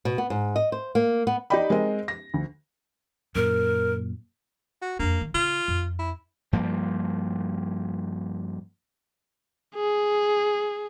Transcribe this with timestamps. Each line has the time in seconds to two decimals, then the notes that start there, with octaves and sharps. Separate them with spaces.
0.05 B2
0.18 B3
0.30 G#2
0.56 D#5
0.72 C5
0.95 A#3
1.27 B3
1.50 D#4 G4 D5 D#5 G5 B5
1.70 G#3 C4 A#4 D#5
2.08 A#6
2.34 D2
3.35 F#2 A#2 A#4
4.82 F#4
4.99 F2 A#3 D4
5.21 D#3
5.34 C#3 F4
5.68 F2
5.99 E4
6.53 G2 F3 A#3
9.75 G#4